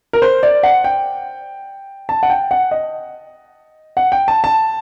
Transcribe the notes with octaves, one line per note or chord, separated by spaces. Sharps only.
A#4
C5
D5
F#5
G5
A5
F#5
G5
F#5
D#5
F#5
G5
A5
A5